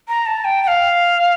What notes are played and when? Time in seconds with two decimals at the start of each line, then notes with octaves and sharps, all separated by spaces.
0.08 A#5
0.26 A5
0.45 G5
0.63 G5
0.68 F5